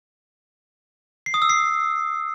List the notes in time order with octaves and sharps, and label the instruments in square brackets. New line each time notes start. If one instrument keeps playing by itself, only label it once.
[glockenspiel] C7
D#6
E6
C7